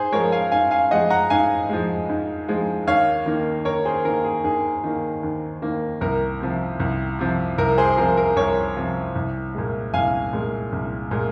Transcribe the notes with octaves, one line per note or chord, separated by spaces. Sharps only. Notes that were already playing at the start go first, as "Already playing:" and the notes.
Already playing: G#2 G#4 C5
F3 G#3 A#4 C#5
F5 G#5
G#2 F5 G#5
F5 G#5
F3 G#3 D#5 F#5
F#5 A#5
G#2 F5 G#5
F3 G#3
G#2
F3 G#3
D#2 C#5 F5
D#3 A#3
D#2 A#4 C#5
G#4 C5
D#3 A#3 A#4
G#4
D#2 G#4
D#3 A#3
D#2
D#3 A#3
C2 A#4
C3 F3
C2
C3 F3
C2 A#4
G#4 C5
C3 F3 A#4
A#4
C2 A#4 C#5
C3 F3
C2
A#2 G#3
C2 F5 G#5
A#2 G#3
C2
A#2 G#3